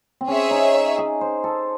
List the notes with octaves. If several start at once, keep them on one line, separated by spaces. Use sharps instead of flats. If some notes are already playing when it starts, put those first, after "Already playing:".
C4
C#4 G#4 C#5 E5
D#4
G#4
C5
A4